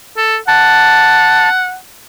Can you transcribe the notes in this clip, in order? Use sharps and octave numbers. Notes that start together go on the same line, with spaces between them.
A4
F#5 A5